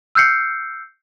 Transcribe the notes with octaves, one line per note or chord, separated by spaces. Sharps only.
E6 F6 G6 C7 C#7